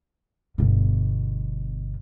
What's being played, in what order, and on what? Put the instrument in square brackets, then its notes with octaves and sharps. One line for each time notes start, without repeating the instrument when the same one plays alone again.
[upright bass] G1 B2